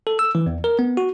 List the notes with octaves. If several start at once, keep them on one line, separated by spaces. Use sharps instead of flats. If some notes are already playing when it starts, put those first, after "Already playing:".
A4
E6
E3
E2
A#4
B3
F#4